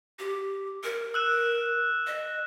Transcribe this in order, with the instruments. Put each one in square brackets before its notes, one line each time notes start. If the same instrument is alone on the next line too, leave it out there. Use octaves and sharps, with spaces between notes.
[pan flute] G4
A#4
[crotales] E6 F#6 E7
[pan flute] D#5